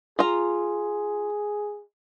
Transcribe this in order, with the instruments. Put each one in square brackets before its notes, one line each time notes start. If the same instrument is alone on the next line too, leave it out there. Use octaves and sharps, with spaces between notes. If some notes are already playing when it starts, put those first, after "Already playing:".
[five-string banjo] F4 A#5 [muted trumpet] G#4